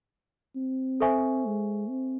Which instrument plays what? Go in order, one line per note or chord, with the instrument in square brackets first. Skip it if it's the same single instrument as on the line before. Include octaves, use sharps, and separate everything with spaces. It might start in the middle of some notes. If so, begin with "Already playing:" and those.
[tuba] C4
[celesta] A4 C5 E5 G#5 C#6
[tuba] G#3
C4